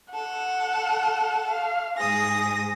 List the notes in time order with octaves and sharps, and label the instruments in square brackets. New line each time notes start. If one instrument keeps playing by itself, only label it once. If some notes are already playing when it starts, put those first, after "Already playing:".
[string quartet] A4 [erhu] F#5
[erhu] F5
[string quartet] G#2 D#6 A#6 [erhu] G#4